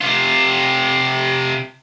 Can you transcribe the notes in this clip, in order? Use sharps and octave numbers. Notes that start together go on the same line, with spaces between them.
C3 F4